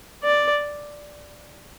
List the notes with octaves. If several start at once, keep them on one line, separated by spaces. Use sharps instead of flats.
D5